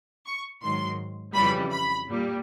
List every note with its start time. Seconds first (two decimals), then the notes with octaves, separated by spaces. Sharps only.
0.26 C#6
0.63 G#2 D#3 F#3 C6
1.34 F2 C#3 E3 G3 B5
1.71 B5
2.07 A#2 G3